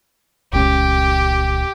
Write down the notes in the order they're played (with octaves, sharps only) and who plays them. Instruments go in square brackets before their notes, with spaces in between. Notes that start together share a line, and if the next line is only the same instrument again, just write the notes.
[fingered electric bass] D#1 C#2 C#4 [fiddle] G4